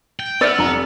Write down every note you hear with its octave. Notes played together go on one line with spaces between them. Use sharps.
G5
B3 C5 D5 E5 E6 F6
F1 F4 A#5